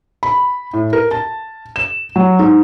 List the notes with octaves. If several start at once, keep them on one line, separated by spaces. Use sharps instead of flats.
B5
A2
A#4
A5
E7
F#3
G#2